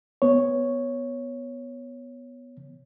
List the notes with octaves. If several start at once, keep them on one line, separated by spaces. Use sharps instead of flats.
B3 C#5